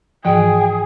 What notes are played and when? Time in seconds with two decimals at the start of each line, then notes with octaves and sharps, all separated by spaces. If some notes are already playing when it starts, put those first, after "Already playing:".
0.25 G#2 E3 F3 G#4 G5